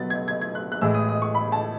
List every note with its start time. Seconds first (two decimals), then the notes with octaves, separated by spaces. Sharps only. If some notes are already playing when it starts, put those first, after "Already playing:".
Already playing: B2 F#3 B3 A6
0.10 G#6
0.28 G#6
0.41 G#6
0.55 F#6
0.72 F#6
0.81 A2 E3 G#3 E6
0.94 D#6
1.09 D#6
1.22 C#6
1.35 B5
1.52 A5